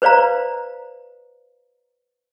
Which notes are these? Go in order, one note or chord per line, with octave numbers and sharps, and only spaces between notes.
B4 C5 D5 F5 A#5